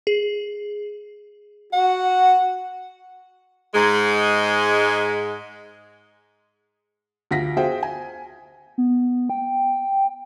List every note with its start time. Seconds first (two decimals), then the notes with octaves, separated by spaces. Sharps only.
0.07 G#4
1.73 F#4 F#5
3.74 G#2 G#3
7.31 D2 F4 A#6 B6
7.57 F#4 G#4 C5 E5 F5 G5
7.83 G#5
8.78 B3
9.30 G5